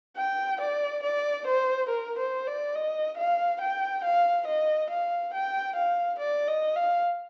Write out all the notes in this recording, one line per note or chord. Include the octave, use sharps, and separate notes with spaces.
G5
D5
D5
C5
A#4
C5
D5
D#5
F5
G5
F5
D#5
F5
G5
F5
D5
D#5
F5